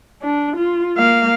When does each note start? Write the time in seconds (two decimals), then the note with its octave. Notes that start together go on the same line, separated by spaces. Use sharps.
0.22 D4
0.57 F4
0.97 A#3 F5